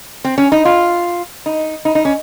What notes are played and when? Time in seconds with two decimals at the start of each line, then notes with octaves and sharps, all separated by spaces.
0.24 C4
0.38 C#4
0.52 D#4
0.65 F4
1.46 D#4
1.85 D#4
1.95 D#4
2.05 C#4